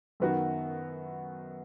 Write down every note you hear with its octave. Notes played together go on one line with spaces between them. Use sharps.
F#2 D#3 B3 F#4